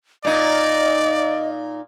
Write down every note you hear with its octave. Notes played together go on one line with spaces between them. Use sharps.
A#2 D#4 D5 D#5